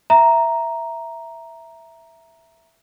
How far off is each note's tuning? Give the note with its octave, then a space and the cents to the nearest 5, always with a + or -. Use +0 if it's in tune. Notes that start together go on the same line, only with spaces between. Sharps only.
E5 +0 A#5 +0